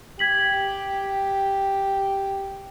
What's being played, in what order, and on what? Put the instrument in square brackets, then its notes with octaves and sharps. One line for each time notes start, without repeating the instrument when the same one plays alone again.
[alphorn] G4 [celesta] G#6 B6 F#7